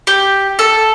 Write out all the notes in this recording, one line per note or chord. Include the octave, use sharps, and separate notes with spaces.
G4
A4